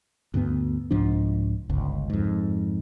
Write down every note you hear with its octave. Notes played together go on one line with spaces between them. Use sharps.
D2 G2 A#3 B3
C2 G#2 F3 D4
G1 C#2
F2 G#2